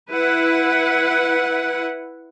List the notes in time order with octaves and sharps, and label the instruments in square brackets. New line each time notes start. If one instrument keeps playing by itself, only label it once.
[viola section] E4 B4 F#5